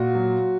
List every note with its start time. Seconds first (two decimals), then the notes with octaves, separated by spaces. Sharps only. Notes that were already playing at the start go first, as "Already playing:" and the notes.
Already playing: A#2 F#4
0.15 F#3